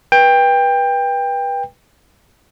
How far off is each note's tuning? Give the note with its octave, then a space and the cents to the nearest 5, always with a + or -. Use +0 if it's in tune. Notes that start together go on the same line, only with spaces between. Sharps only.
B4 -25 G5 +20